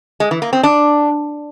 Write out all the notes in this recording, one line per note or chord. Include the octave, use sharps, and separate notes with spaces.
G#3
E3
A#3
C4
D4